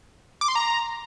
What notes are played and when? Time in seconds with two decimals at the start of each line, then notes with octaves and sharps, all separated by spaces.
0.41 D6
0.48 C6
0.55 A#5